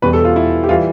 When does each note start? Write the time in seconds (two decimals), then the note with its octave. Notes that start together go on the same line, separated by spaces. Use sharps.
0.02 E2 B2 G3 B4
0.13 A4
0.25 F4
0.36 E4
0.64 G4
0.69 E3 G3 F4